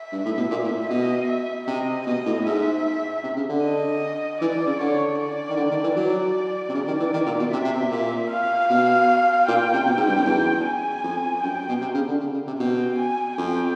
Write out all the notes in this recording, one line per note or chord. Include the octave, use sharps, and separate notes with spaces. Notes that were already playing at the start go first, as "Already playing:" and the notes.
Already playing: E5
G2
A2
B2
A#2
A2
B2 D#5
E5
C3 D#5
B2 D#5
A2
G#2 E5
C3
C#3
D3
D#5
E3 D5
C#3
D3 C#5
D5
D#3
D3
D#3
E3
F#3 D5
C3
C#3 D5
D#3
E3
D#3
A#2
B2
C3 E5
C3
B2
A#2
F5
B2
A#2 G5
C3
B2
G#2
G2
F#2
E2
G#5
F2
F#2 G5
B2
C3
C#3
D3
C#3
C#3
C3
B2 G5
G#5
F2 G5